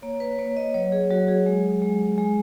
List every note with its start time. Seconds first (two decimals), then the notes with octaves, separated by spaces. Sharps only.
0.02 A#3 C#5
0.20 B4
0.39 A#3 C#5
0.57 D#5
0.74 F#3 C#5
0.92 G#4
1.10 F#3 F#4
1.28 G#4
1.46 G#3
1.82 G#3
2.18 G#3